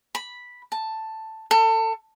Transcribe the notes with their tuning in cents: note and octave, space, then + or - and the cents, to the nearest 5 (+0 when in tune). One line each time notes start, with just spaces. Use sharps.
B5 -5
A5 +5
A4 +30